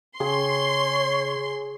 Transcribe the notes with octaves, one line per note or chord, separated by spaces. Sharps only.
C#3 G#4 C#5 C6